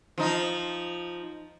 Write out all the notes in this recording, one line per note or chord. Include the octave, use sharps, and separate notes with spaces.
F3 D#4